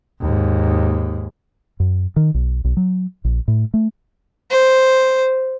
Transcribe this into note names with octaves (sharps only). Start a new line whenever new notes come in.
D#2 G#2
F#2
D#3
B1
B1
F#3
A#1
A2
A3
C5